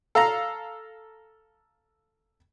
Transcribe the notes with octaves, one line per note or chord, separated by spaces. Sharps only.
A4 F5 A#5